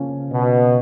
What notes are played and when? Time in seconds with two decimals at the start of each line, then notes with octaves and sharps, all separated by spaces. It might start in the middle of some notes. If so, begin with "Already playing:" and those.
Already playing: C#3 F3 A#3 C#4 F4
0.30 B2